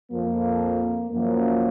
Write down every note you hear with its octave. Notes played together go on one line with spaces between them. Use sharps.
F2 F3 A#3
F#2 F3 A#3